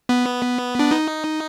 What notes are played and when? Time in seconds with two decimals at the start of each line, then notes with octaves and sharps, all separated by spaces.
0.09 B3
0.79 D4
0.91 D#4